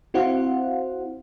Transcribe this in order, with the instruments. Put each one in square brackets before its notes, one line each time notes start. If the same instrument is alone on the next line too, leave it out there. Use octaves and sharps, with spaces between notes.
[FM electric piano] C4 E4 F#4 C5 F5 F#5